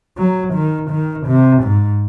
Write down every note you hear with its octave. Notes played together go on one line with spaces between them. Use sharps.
F#3
D#3
D#3
C3
G#2